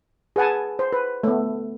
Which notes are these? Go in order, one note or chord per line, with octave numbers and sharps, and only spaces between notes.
G#4 B4 F#5 G#5 A5
C5
B4
A3 B3